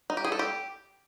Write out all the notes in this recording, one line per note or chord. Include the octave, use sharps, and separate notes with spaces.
D#4
G4
G#4
A4
G4